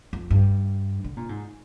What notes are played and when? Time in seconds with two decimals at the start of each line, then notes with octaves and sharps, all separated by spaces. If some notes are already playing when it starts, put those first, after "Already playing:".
0.13 F2
0.31 G2
1.04 D3
1.17 A#2
1.29 G#2